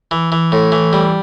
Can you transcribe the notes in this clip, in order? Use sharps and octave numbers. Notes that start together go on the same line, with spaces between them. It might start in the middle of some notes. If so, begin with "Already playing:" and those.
E3
E3
A2
E3
G3